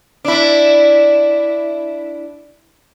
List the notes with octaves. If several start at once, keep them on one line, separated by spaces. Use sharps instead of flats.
D4 E4